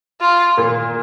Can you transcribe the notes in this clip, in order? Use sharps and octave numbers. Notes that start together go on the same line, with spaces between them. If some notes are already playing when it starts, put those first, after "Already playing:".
F4
A#2 A#3